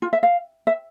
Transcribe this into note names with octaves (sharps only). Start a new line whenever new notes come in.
F4
E5
F5
E5